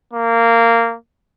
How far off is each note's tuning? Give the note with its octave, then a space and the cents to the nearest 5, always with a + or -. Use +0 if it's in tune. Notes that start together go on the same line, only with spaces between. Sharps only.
A#3 -15